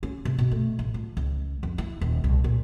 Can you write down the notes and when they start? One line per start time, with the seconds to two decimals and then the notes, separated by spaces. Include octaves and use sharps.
0.03 C#4
0.25 C3
0.39 B2
0.51 A3
0.79 A1
0.94 F3
1.17 C#2
1.63 F2
1.78 E4
2.01 D#1
2.24 C2
2.44 A#2